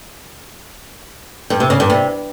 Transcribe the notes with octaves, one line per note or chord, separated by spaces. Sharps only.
G2
C3
C#3
G2
C3